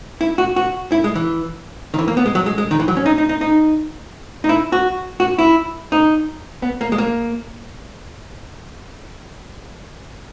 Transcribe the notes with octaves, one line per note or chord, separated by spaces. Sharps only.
E4
F#4
F#4
E4
G#3
E3
D#3
E3
A#3
B3
G#3
F#3
G#3
G#3
D#3
E3
F#3
C#4
D#4
D#4
D#4
D#4
D#4
E4
F#4
F#4
E4
D#4
B3
A#3
G#3
A#3